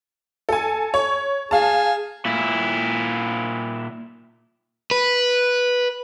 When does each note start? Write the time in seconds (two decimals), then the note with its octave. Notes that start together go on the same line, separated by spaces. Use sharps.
0.49 A4 G#5
0.94 C#5
1.51 G#4 F5 A5
2.25 A#2 E4
4.91 B4